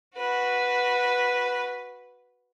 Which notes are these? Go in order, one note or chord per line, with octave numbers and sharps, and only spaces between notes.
F#4 B4